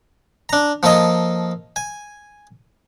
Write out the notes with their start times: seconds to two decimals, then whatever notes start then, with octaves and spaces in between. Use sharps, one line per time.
0.49 D4 A#5
0.83 F3 A#3 A4 D#5
1.76 G#5